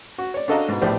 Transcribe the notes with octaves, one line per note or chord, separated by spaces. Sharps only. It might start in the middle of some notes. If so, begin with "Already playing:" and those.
F#4
C#5 D5
D4 F#4 A4 D#5 F5 A#5
G#2 B2
A#1 A2 B3 G4 C5 D5